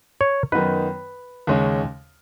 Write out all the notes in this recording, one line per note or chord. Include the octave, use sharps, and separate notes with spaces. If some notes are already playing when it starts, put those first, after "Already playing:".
C#5
F#2 D#3 B3 D#4 B4
D#2 C#3 G#3 C#4